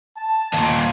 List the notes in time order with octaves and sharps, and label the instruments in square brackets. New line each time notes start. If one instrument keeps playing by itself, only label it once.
[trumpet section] A5
[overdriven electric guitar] D#2 A#2